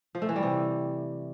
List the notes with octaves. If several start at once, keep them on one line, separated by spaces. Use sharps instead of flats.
F3
A3
E3
G3
C3